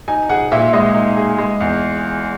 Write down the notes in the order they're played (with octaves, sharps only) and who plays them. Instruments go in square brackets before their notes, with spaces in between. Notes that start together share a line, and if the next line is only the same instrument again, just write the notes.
[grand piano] D#4 [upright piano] G#5
[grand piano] G#4 [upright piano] F#5
[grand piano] A#2 [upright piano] E5
[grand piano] G#3 [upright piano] D#5
[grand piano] D#4
G#4
G#3
E2